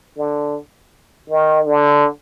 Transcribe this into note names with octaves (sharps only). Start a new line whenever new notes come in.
D3
D#3
D3